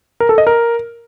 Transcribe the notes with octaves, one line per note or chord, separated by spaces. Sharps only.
A#4
A4
D#5
A#4